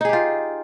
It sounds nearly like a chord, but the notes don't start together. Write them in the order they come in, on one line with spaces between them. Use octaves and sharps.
D#4 G#4 G4 F4